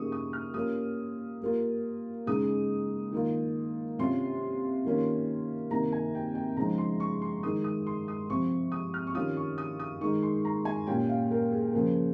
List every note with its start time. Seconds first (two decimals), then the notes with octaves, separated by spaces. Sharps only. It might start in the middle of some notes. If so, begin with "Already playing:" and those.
Already playing: C#3 G3 A#3 D#4 C#6 D#6
0.12 D#6
0.33 F6
0.54 G3 A#3 C#4 F4 D#6
1.41 G3 A#3 F4
2.26 C#3 G#3 D#4 D#6
3.12 D#3 A#3 F4
3.99 C3 G3 C#4 F4 C6
4.85 D#3 G3 A#3 C#4 F4
5.70 C3 D#3 A#3 A#5
5.92 G#5
6.15 G5
6.35 G5
6.57 C#3 F3 G#3 D#4 A#5
6.78 C6
7.00 C#6
7.22 C6
7.43 D#3 G#3 D#4 D#6
7.64 D#6
7.87 C6
8.08 D#6
8.29 C3 F3 C4 C#6
8.72 D#6
8.94 F6
9.07 C#6
9.15 D#3 G3 C#4 F4 D#6
9.37 C#6
9.58 D#6
9.79 D#6
10.01 D#3 G#3 D#4 C#6
10.22 C6
10.45 A#5
10.65 G#5
10.87 A#2 G3 C#4 F4 G5
11.09 F5
11.31 A#4
11.52 G#4
11.73 C#3 F3 A#3